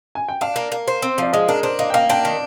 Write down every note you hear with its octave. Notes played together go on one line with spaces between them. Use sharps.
G#5
G5
D4 F5
A#3
A#3
C5
C4
F3 D5
G#3 D#5
D4 A#4
D4 C5
A#3 D#5
G5
A#3 F5
D4 G5
D#3